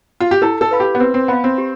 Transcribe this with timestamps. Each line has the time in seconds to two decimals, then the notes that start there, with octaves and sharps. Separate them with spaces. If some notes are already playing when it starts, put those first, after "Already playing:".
0.20 F4
0.31 G4
0.42 E4 A4
0.61 A4
0.71 B4 F5 B5
0.80 G4
0.95 B3
1.00 C4 B4
1.14 C4
1.28 B3 F5 B5
1.44 C4
1.58 G4